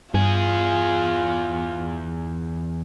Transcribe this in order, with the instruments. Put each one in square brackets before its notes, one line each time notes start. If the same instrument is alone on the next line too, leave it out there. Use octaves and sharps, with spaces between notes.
[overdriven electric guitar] E2 G#4 [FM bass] G2 [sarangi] F4